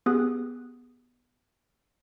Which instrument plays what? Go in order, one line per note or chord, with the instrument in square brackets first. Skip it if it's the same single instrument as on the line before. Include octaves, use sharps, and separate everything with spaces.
[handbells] B3 G4 G#4 D#6 F#6